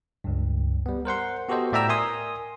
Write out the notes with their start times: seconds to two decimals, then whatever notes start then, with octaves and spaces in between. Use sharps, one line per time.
0.24 C#2 G2
0.86 G3 B3
1.05 A#4 C5 F#5 C6
1.49 B3 F#4 G4 A4 C5 D#5
1.73 A2 D5 E5 G5 A#5 E6
1.89 A#4 G#5 C6 D#6